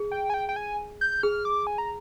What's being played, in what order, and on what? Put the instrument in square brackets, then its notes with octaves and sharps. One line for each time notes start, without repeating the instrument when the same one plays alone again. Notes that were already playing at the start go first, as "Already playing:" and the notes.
Already playing: [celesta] G#4
[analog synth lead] G5
G#5
G5
G5
G#5
G6
[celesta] G#4 [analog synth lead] F6
[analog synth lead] D6
G#5
A#5